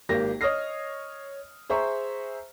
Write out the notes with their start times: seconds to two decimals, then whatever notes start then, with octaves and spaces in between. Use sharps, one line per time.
0.09 G#1 A#3 G4 A#6
0.41 C#5 D#5 D#6 F6 A#6 C7
1.70 G#4 C5 E5 A#5 C#6